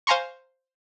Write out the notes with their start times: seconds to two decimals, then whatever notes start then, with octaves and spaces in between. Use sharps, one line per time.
0.07 C5 F5 G#5 A#5 C6 C#6